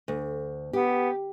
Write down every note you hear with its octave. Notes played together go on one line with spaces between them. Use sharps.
D2
B3 G4